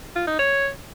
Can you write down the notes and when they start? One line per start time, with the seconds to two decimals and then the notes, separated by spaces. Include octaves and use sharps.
0.16 F4
0.27 D#4
0.39 C#5